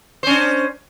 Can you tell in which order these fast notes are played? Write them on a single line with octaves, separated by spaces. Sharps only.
C5 C#4 D4